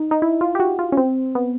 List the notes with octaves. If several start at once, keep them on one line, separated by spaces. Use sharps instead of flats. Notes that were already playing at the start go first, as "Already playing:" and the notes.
Already playing: D#4
D#4
E4
F4
G4
F#4
F4
C#4
C4
B3